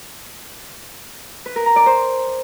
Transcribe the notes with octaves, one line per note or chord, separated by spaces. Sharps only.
B4
A#4
A#5
D5
C5